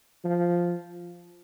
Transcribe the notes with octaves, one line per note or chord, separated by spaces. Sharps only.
F3